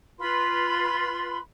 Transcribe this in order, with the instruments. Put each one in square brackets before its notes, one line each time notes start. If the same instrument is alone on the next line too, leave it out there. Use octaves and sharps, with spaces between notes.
[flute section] F4 B4 B5 C6